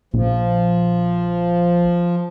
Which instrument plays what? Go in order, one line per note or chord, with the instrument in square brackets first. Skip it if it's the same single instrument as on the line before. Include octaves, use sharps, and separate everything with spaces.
[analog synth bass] A#1 [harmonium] F3